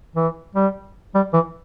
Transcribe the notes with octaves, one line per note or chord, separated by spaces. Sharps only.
E3
G3
G3
E3